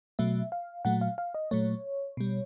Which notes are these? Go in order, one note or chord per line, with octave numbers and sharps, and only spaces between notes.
B2 F#3 A3 E5
F5
A#2 F#3 A3 F#5
F5
F5
D#5
A#2 F#3 A3 C#5
B2 G3